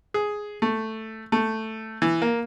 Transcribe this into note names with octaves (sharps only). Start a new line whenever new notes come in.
G#4
A3
A3
E3
A#3